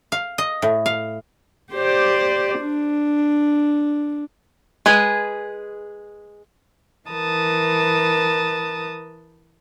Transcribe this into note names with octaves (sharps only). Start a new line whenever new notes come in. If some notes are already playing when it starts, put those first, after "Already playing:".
F5
D#5
A2
F5
G4 C5 D5
D4
G#3 G#4 B4
E3 A#4 B4 A5 D#6